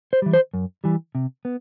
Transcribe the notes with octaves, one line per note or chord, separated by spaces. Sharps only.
C5
E3 G3
C5
F#2
E3 G3
C3
B3